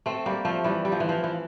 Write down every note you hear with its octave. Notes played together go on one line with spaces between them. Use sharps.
A3 C4
G3 A#3
F3 A3
E3 G3
G3
F3
E3
F3
E3